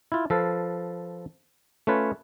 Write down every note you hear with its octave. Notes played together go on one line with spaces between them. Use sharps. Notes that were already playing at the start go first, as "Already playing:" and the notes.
E4 F4
F3 A4 B4 F5
A3 C#4 F4 B4 C#5